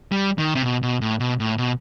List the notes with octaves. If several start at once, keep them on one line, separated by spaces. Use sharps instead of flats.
G3
D#3
C3
B2
B2
A2
B2
A2
B2